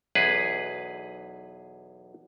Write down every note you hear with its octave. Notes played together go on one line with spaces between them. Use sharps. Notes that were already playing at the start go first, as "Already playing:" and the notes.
B1 E2 G#4 B4